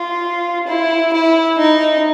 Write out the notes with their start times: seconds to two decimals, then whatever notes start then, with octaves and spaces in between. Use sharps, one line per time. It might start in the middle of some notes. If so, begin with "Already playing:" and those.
Already playing: F4
0.67 E4
1.13 E4
1.58 D#4